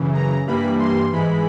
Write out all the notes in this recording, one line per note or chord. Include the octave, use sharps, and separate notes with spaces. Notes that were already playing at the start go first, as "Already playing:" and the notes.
Already playing: F#2 C#3 E3
A#5
G2 E3 G3 A#3 B5
C6
G#2 E3 G#3 B5